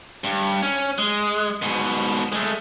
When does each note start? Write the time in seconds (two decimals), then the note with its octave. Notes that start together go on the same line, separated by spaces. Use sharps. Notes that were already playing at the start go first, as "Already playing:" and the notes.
0.24 G2
0.63 C#4
0.98 G#3
1.62 G#2 B2
2.32 G#3 A3